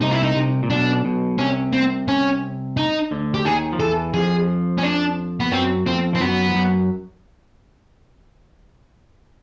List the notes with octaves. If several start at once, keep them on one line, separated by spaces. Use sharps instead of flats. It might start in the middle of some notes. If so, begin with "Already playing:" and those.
C2 C3 D#4
E4
D#4
C2 C3
A#2
B1 B2 D4
B1 B2
C2 C3 C#4
C4
C#4
D#4
D2 D3
G4
D#2 D#3 G#4
F3
E2 E3 A4
F2 F3 G#4
C#4
D4
B3
F#2 F#3 C4
F2 F3 C4
F3 C4
F#2 F#3 B3
F3
F#2 F#3